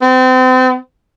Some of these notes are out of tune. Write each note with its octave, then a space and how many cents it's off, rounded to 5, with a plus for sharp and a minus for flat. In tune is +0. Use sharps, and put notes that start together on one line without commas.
C4 -35